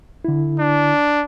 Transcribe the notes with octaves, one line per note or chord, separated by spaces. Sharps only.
D3 E4
D4